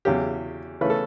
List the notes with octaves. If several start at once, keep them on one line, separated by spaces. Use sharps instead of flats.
E2 C#3 F#3 G4
C#3 E3 A3 C#4 B4
A4